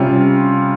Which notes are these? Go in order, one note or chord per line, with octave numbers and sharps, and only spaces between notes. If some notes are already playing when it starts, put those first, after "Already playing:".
Already playing: C3 G3 C#4 F4